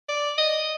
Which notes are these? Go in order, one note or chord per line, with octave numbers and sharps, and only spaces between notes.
D5
D#5